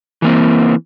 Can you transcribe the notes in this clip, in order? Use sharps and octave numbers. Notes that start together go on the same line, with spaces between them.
E3 A#3 C4